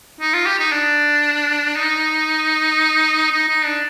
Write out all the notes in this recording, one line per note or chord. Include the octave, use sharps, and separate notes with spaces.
D#4
F4
G4
D#4
D4
D#4
D#4
D#4
D4